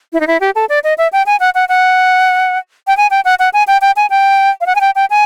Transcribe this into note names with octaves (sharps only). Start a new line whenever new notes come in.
E4
D#4
E4
G4
A4
D5
D#5
E5
G5
G#5
F#5
F#5
F#5
G5
G#5
G5
F#5
F#5
G#5
G5
G5
G#5
G5
F5
F#5
G#5
G5
G5
G#5